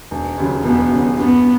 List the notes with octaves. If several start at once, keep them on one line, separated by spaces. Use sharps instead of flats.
E1
D#2 C#3 F#3
E1 B3
D#2 C#3 F#3
G2 B3